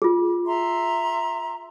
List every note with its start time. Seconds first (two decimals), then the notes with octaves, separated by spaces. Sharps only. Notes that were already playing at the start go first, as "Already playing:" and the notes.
0.02 F4 G#4
0.45 E5 A#5 C6